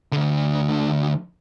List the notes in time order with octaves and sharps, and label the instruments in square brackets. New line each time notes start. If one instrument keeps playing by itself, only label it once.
[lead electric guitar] D2 D3